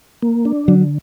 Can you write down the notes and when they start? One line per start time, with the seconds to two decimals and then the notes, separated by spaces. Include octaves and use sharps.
0.22 A#3
0.45 D4
0.68 D3 F#3